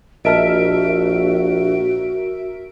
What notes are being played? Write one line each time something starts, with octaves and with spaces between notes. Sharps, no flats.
A#1 F#4 A#4 D#5 E5 A5 F6 D7